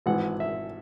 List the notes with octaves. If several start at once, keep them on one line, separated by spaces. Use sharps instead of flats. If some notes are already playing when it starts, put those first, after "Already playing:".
G#1 G#2 E3 F#5
E5